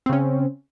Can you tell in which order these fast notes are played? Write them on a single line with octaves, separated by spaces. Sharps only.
C4 C#3 C#4